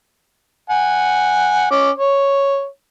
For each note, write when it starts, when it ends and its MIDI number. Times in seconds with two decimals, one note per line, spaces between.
0.70 1.67 78
0.70 1.67 80
1.71 1.91 61
1.71 1.91 86
1.98 2.66 73